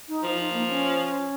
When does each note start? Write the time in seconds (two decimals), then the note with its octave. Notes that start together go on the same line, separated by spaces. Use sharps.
0.08 D#4
0.23 F3
0.38 D#4
0.53 A#3
0.68 C#4